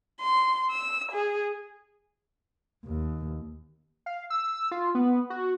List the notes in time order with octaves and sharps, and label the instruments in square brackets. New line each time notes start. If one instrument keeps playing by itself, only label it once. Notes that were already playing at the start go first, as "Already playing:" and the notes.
[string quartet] C6
E6
G#4
[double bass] D#2
[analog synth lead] F5
E6
F4
B3
F#4